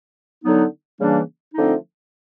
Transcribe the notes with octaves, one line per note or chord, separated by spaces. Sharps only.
D3 F#3 B3 D#4
C#3 E3 G3 A#3 D4
D3 F3 A3 C4 D#4